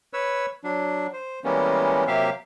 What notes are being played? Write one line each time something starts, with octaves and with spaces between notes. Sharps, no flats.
B4 C#5 E6
F#3 D4
C5
E3 G3 G#3 A#3 B3 C#4
C3 F#3 A#3 G4 E5 F5